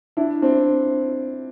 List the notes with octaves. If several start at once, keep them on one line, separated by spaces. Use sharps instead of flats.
D4 E4
C4 D4